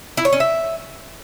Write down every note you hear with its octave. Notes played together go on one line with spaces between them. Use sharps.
E4
C#5
C#4
E5